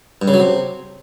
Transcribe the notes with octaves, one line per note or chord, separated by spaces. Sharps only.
G2
C#3
F#3
C3